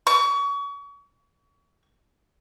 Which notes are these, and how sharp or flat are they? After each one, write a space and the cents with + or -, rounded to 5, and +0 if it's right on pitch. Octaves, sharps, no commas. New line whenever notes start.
C#6 +35